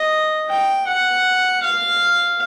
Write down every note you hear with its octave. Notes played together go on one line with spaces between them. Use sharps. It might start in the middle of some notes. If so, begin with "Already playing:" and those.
Already playing: D#5
G5
F#5
F5